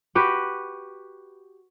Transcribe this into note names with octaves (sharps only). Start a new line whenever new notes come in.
F#4 G4 B4